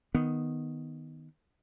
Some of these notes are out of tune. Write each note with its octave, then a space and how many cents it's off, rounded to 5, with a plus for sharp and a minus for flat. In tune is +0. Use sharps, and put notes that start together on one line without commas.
D#3 +0 B3 +0